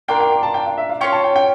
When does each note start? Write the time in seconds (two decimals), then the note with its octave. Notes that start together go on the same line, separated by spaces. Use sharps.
0.08 A#3 D4 F4 A#4 G5
0.20 G5
0.32 G5
0.43 A5
0.54 G5
0.66 F5
0.78 E5
0.89 F5
1.01 C#4 F4 C#5 G5
1.12 A5
1.24 G5
1.36 G5